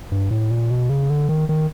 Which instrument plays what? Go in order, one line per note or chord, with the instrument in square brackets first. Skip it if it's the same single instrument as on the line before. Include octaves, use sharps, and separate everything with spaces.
[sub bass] G2
A2
A#2
B2
C#3
D3
D#3
D#3